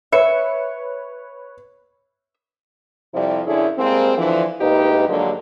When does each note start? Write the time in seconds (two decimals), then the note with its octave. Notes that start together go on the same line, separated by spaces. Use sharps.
0.12 B4 C#5 E5 C#7
3.14 F2 C3 F3 G3 E4 C5
3.47 F#2 D3 E4 G#4 C#5 D5
3.78 G3 G#3 A#3 C4
4.17 D3 E3 F3
4.61 D2 G#2 A#3 D#4 G4 B4
5.08 G2 D3 F3 F#3 G#3 A#3